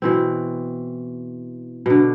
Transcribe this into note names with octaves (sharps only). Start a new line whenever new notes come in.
B2 E3 C4
B2 D3